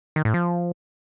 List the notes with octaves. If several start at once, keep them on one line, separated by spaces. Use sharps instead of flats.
D#3
A2
F3